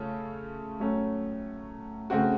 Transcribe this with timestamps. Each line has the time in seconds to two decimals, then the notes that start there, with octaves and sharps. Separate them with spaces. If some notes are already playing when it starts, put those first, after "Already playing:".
Already playing: C#3 A3 C#4 F4 A4
0.79 A2 F#3 A3 C#4
2.10 C#3 A3 C4 F#4